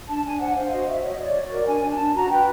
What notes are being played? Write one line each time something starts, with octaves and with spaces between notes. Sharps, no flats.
D4 A5
D4 G#5
C5 F#5
C5 F5
F#4 D#5
F#4 E5
C#5 D#5
C#5 D5
F#4
D5
A#4
D4 G#5
D4
A5
D4
F#4 A#5
B4 G5